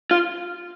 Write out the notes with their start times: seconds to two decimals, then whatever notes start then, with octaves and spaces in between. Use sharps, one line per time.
0.11 F4